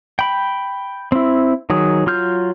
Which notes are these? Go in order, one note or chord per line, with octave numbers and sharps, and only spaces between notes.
G5 B5
C4 E4
D#3 F#3 G#4
F#3 F4 F6 G6